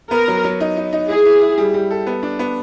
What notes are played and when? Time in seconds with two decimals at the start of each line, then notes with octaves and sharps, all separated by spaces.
0.11 B3 A#4
0.28 F#3
0.44 F#3
0.60 D#4
0.77 D#4
0.93 D#4
1.09 E4 G#4
1.25 E4
1.41 E4
1.58 G3
1.74 G3
1.91 A4
2.07 B3
2.23 D4
2.39 B3